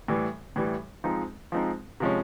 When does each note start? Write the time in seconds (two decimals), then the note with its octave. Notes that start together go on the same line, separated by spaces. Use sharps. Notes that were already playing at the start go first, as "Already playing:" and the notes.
0.08 A2 E3 G3
0.56 A2 E3 G3
1.04 F3 G#3 C4 D#4
1.52 F3 G#3 C4 D#4
2.00 C3 F3 G#3 C#4